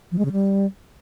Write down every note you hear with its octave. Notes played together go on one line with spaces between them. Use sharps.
F3
G#3
C#3
G3